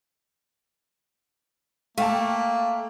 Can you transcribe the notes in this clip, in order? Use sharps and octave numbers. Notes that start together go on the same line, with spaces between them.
A3 A#3 F5 G5 A5